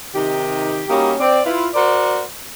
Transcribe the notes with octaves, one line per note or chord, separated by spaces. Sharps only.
C3 D#3 D#4 G4
G3 A#3 C#4 D#4 F#4 G4
C4 D5
E4 F4 B4
F#4 A#4 C5 D5